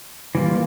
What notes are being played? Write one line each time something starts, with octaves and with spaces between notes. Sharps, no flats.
E3 G3 A#3 F4